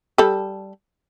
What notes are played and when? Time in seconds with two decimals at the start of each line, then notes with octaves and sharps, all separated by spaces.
0.18 G3 A4